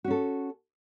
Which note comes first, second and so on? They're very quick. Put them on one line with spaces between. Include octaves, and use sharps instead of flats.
F#4 C#4 A4